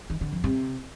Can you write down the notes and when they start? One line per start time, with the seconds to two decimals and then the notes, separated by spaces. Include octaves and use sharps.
0.10 D#3
0.21 D3
0.32 F2
0.44 C3